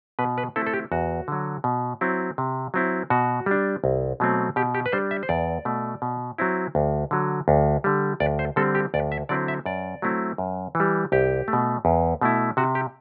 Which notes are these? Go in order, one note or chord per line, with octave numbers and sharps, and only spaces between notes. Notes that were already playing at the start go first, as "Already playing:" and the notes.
B2 B4
B4
A3 C4 E4 A4
A4
G4
E2 F#4
D3 F#3
B2
F#3 C4 E4
C3
F#3 C4 E4
B2 F#4
G3 D4
C2
B2 F#3 A3 C4
B2 G4
G4
B4
G3 D4 C5
E5
C5
E2 D5
B2 A3
B2
F#3 C4 E4
D2
D3 F#3
D2
D3 G3
D2 D5
C5
D3 G3 C4 A4
G4
D2 D5
E5
D3 F#3 C4 E4 D5
E5
F#2 D5
F#3 A3 C4 E4
F#2
E3
G3
C2 G4
A3
B2
E2
B2 A3 E4
C3 F#4
G4